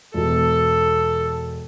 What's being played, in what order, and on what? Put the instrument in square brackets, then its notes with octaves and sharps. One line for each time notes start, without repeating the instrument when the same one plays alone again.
[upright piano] E1 [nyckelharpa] A4